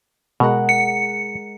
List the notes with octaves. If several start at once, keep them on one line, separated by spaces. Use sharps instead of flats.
B2 G#3 A#4 F#5
C#7